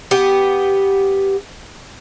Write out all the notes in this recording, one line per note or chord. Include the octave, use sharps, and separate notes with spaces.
B3 G4